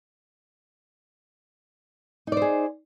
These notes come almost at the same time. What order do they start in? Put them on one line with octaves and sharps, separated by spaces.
D#4 D5 C5 G#4